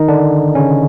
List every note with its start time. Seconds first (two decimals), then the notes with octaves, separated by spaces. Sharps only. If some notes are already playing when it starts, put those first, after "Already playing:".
Already playing: D#3 D#4
0.08 D3 D4
0.55 C#3 C#4